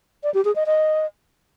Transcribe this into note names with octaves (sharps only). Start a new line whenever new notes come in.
D5
G4
G#4
D#5
D#5